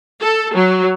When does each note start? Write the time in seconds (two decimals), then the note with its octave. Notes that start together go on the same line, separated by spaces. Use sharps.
0.21 A4
0.55 F#3